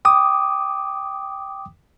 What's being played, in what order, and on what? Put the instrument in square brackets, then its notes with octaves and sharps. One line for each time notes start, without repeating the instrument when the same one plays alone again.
[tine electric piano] G5 D6 D#6